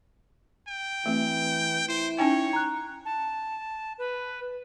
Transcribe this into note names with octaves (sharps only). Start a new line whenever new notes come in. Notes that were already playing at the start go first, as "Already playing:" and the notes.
G5
E3 A3 C4
E4 C5
C#4 D#4 C#5 G5 G#5
A#5 F#6
A5
B4